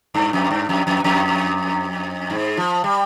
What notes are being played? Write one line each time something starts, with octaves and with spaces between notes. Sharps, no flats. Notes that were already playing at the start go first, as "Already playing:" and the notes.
G2
F2
G2
F2
F2
F2
G#2
F3
G3